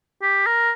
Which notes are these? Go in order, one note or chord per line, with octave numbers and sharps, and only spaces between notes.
G4
A#4